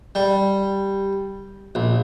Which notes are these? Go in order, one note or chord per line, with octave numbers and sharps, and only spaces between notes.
G3
A#1